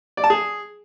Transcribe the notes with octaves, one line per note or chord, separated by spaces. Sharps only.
D5
A5
G#4